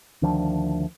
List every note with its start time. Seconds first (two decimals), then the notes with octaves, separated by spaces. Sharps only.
0.22 D2 D#3 F3 D4